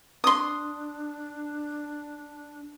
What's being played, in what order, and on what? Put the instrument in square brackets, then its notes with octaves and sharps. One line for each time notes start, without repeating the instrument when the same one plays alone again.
[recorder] D4 [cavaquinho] C6 D#6